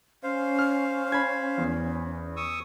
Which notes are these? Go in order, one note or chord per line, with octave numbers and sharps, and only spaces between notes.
C#4 C5 F5
F6
B5 G#6
E2
C#6 D#6 E6